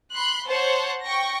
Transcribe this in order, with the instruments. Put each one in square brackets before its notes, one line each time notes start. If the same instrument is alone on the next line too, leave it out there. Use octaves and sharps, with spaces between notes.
[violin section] B5 C6 F#6
C5 C#5 F#5 A5
G5 C#6 A#6